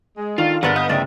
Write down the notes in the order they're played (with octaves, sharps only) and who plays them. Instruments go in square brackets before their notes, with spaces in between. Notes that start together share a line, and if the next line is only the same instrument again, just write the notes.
[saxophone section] G#3
[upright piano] D#3 [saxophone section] D4 A4 F5 [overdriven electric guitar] F4 [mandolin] D5
[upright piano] G1 [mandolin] A#4 D5 F#6 [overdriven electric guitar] B4 F#5
[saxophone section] D#5 F5 [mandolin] G6
[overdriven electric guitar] A2 C#3 [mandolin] D5 E5 G5